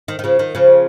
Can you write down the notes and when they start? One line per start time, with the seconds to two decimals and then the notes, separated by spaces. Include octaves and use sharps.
0.08 D#3
0.19 D#3
0.24 C#3 F3
0.39 D#3
0.55 C#3 F3